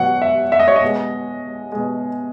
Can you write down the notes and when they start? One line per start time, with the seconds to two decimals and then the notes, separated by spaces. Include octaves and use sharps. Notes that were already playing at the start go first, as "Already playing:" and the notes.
Already playing: B2 F#3 F#5
0.22 E5
0.52 E5
0.60 D#5
0.68 C#5
0.76 D#5
0.81 B2 G#3
1.72 B2 G#3